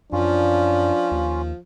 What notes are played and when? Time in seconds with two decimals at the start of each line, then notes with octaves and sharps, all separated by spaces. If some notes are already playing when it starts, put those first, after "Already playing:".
0.13 F#2 F3 C#4 D4 F4
1.12 D#2